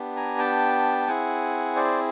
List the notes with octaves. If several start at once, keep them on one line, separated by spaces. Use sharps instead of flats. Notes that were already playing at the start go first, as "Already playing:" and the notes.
Already playing: B3 D4 G4
G#5 A#5
G5 A5
C4 E4 G#4 F#5 G#5
C5 D5